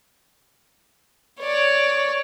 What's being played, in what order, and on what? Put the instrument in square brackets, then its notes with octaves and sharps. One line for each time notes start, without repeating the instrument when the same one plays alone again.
[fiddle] C#5 D5